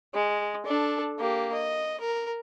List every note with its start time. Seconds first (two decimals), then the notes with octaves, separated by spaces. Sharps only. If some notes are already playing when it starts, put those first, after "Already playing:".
0.15 G#3
0.66 D4 A4
1.19 A#3 G4
1.54 D#5
2.00 A#4